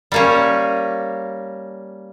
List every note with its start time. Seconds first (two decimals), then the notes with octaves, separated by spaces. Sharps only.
0.12 G3 A#3 C#4